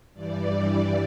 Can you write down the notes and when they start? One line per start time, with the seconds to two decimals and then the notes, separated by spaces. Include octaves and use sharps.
0.13 G2 E3 G3 D5